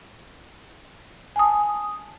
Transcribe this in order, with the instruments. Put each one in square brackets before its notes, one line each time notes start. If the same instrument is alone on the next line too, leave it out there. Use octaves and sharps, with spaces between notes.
[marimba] G#5 A5 D#6